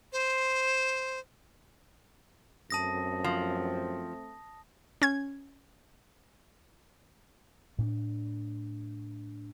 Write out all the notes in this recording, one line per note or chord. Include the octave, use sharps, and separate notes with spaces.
C5
F#2 A3 C4 A5 D#6 A#6
F3
C#4 G#6
A2 C#4 D4